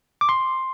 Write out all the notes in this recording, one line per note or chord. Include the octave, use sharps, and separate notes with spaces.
D6
C6